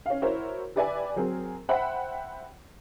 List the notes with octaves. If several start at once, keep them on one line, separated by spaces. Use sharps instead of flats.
C#4 F5
E4 F#4 A#4 C5 C#5
G4 B4 D5 E5 G#5
F#3 C4 G#4 A#4
C5 E5 F#5 G5 B5